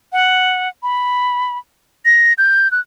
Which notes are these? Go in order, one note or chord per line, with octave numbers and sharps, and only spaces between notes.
F#5
B5
A#6
G6
F#6